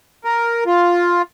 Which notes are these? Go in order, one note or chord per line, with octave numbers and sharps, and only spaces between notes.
A#4
F4